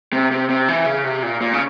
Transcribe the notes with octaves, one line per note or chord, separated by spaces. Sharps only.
C3
C3
C3
E3
C#3
C3
A#2
A#2
C#3